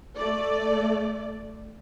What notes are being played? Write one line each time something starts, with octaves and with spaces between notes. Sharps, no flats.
A3 D5